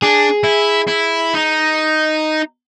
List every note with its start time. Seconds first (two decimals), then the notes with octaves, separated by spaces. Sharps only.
0.02 D4 G#4
0.44 E4
0.87 E4
1.34 D#4